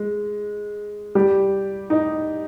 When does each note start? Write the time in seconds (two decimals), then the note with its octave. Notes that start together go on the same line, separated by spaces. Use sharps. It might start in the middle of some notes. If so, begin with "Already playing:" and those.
Already playing: G#3
1.15 G3 G4
1.90 D#4